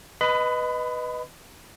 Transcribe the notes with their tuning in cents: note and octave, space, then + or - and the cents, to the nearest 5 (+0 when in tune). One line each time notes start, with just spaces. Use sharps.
B4 +0 D#5 +0 B5 +30